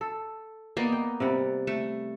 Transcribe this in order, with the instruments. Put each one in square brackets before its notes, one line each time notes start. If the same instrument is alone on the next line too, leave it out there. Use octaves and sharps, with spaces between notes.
[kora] A4
[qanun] A#3 B3 D#5 [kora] D5
[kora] G5
C3 G3 F#5
[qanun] A3